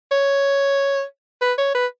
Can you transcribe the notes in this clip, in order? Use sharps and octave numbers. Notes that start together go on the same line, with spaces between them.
C#5
B4
C#5
B4